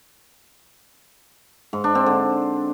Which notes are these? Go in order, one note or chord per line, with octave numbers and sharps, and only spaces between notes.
G#2
D4
C4
D3